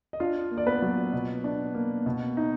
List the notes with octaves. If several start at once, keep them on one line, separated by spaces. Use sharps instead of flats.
D#5
D4 F4 F5
A#3
D5
B3 B4
F#3
B2
D4
A#3
B2
D#4